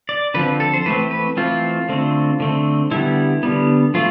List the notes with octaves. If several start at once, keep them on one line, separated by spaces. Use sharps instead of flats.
D5
D3 F3 C4 B4
A4
C5
E3 A3 C4 B4
B4
E3 A3 C4 F4
D3 A3 C4
D3 A3 C4
D3 G3 B3 E4
D3 G3 B3
F3 A3 F4